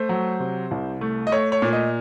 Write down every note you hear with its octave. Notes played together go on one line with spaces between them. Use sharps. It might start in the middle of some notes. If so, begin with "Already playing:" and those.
Already playing: A3 C5
F#3
C3
C2
A3
D#5
A3 C#5
C#5
A#2
D#5